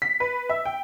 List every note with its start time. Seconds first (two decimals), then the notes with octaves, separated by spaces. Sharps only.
0.02 B6
0.20 B4
0.50 E5
0.65 G5